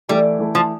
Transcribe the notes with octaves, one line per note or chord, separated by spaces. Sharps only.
E3 G3 A3 E4 A4
E3 A3 E4 A4
F3